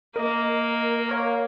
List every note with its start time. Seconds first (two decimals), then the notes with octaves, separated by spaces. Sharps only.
0.16 A#3 A#4 D#5
1.09 A#4 C#5 F5